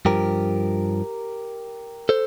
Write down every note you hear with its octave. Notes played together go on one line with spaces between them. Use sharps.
G2 F3 G4 A#4
A4 C5